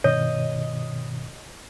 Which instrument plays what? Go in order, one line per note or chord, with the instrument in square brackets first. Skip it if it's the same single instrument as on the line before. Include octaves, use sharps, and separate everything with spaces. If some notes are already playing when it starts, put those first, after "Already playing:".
[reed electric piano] G2 B2 D#3 [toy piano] C#5 [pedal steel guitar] D#5